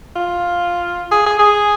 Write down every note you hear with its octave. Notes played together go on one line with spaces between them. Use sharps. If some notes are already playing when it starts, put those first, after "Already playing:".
F4
G#4
G#4
G#4